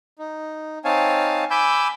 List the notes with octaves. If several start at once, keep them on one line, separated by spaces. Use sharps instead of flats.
D#4
C4 D#4 C#5 F5 G#5 A5
G#5 B5 D6 E6 G6